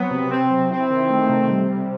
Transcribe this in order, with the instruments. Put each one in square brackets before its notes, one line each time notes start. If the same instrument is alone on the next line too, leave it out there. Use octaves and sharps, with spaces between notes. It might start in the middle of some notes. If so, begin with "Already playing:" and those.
Already playing: [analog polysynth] F#3 C4 [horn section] B3
[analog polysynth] C3
[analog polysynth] C3 [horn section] C4
[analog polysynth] F#3
[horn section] C4 [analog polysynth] E4
[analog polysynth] D#3
A3
C3
G3
C3